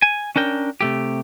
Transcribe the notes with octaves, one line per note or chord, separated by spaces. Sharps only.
G#5
C#4 D4 A#4 G5
C3 A3 G4